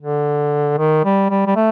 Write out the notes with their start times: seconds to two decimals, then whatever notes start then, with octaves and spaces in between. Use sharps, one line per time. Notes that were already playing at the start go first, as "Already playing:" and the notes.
0.01 D3
0.78 D#3
1.05 G3
1.30 G3
1.47 G3
1.56 A3